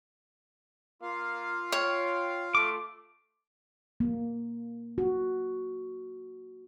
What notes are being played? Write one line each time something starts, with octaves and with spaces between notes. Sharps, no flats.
A#3 F4 F5
C#5 G5
A3 D6
A#3
F#4